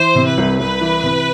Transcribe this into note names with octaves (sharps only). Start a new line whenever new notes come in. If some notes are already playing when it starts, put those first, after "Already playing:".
Already playing: E3 C5
C3
B4
C2
C2 B4
E3
C3